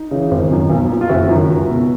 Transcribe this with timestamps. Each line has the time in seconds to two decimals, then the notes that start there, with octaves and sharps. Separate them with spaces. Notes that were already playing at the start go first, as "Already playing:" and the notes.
Already playing: D#4
0.11 C#3 E3
0.31 G#1
0.51 F#2 D#3
0.70 B1
0.90 A#2
1.01 F4
1.09 F#1 E4 F#4
1.29 F#2 D#3
1.49 C#2
1.69 B2